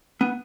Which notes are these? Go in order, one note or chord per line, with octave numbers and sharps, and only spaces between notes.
B3